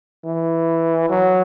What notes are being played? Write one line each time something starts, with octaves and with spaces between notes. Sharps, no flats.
E3
F#3